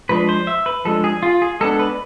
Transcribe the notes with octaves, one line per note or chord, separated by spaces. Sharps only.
F3 G#3 D4 B4
C5
E5
B4
F3 G#3 D4 A4
G#4
F4
G#4
G#3 B3 D4 A4
B4